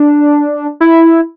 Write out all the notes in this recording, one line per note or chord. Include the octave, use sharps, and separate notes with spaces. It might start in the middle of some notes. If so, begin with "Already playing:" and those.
Already playing: D4
E4